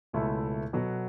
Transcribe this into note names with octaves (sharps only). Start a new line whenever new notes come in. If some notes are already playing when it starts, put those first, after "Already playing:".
C#2 B2 A3 E4
B2 F#3 B3 F#4 A4